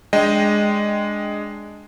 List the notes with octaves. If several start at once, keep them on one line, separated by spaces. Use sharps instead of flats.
G#3 D4 D#5 G5